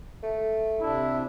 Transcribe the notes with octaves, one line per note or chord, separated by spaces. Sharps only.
A3
C3 D4 E4